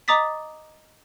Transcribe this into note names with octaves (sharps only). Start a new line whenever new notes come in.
D#5 A#5 D6 D#6 A6 B6